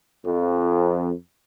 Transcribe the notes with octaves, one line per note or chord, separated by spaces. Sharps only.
F2